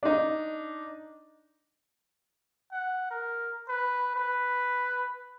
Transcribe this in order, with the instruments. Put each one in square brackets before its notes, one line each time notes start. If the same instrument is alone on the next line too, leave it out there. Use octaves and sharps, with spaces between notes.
[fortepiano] D4 D#4
[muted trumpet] F#5
A#4
B4
B4